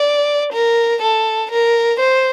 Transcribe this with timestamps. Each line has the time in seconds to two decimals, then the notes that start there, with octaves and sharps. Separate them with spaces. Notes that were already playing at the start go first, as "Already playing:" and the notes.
Already playing: D5
0.52 A#4
1.01 A4
1.51 A#4
2.00 C5